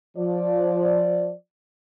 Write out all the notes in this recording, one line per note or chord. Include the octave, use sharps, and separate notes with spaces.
F3 D5